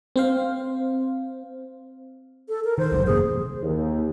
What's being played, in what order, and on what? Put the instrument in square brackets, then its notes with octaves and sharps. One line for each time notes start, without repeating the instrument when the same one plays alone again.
[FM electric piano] C4 C5 F5
[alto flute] A4
A#4
[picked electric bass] D#3 [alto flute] C5
[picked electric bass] G1 C#2 F#2
[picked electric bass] F2 C3 A#3 [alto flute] G#4
[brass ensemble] D#2